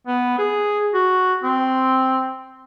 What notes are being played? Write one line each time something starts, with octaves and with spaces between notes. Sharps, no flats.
B3
G#4
F#4
C4